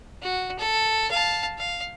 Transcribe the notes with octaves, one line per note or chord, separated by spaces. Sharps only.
F#4
A4
F5 A5
F5